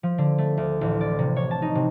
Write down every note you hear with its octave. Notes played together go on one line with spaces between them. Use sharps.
F3
D3
A3
D2
A1
D5
C3
C#5
A5
D#4
C3